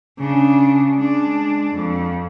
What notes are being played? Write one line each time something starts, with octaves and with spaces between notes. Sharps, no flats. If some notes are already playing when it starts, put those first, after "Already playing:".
C#3 D4
G#3 D4
F2